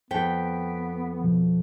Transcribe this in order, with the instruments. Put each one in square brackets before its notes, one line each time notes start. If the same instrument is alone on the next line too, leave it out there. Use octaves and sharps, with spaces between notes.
[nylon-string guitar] F2 G5 [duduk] B3 [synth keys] B6 D7
[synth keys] B2 F3